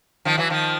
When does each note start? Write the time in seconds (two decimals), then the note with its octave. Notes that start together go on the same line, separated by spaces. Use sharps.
0.25 D#3 F3
0.38 E3 F#3
0.50 D#3 F3